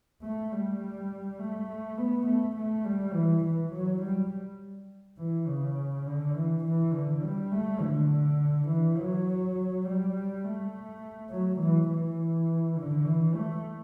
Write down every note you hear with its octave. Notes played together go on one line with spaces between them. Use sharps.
A3
G3
A3
B3
A3
A3
G3
E3
E3
F#3
G3
E3
C#3
D3
E3
E3
D3
G3
A3
D3
E3
F#3
G3
A3
F#3
E3
E3
D3
E3
A3